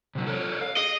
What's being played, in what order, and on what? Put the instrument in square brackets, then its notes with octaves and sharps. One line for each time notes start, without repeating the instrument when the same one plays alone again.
[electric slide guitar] C3 F#3
A4 A#4 C#5
F5
[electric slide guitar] G#4 [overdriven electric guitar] D#5